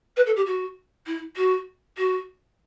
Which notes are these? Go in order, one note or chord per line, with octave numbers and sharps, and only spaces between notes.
B4
A4
G4
F#4
E4
F#4
F#4